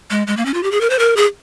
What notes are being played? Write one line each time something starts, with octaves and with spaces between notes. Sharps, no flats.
G#3
G#3
A#3
C#4
F4
G4
G#4
A#4
C5
A#4
G#4